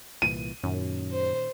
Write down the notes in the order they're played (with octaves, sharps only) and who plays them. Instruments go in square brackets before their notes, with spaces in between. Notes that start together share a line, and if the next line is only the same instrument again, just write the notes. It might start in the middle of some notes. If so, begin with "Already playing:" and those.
[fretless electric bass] C2 A#2 E3 [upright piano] D#7
[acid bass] F#2 [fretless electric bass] A#2 D#3 C#4
[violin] C5